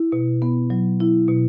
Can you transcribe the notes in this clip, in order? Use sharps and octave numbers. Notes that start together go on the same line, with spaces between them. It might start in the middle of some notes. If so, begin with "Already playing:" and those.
Already playing: E4
B2
B3
F#3
E4
B2